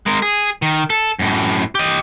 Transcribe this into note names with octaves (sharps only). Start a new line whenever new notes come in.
G#3 A#4
G#4
D#3
A4
F#2 A2
G4 D#5